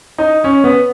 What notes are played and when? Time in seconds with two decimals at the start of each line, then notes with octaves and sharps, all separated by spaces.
0.18 D#4
0.44 C#4
0.64 B3